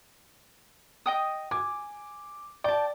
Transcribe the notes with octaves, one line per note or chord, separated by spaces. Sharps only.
D#5 G5 D#6
G#5 D6
D5 G5 A5